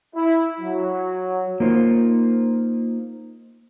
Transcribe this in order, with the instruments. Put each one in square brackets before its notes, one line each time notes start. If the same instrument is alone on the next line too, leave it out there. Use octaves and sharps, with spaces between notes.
[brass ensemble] E4
F#3
[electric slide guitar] A#3 D#4 F4 C5